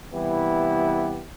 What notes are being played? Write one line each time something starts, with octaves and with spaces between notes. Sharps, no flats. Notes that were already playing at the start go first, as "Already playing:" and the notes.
C3 E3 G3 B3 E4 G4